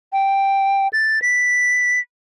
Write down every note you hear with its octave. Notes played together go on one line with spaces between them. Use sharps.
G5
A6
B6